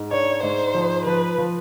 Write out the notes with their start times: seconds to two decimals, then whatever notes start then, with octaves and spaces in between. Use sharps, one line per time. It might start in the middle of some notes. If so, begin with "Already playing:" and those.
Already playing: G#2
0.11 D4 C#5
0.43 G#2 C5
0.74 F3
1.06 F3 B4
1.38 F3